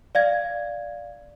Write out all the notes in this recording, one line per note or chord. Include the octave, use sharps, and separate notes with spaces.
D5 F5 G#6